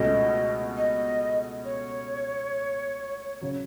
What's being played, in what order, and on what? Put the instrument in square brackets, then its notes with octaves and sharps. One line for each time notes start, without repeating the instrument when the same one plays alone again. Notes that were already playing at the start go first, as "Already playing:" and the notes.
Already playing: [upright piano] C#2 B2 A3 C#4 [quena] D#5
[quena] D#5
C#5
[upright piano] C#3 F#3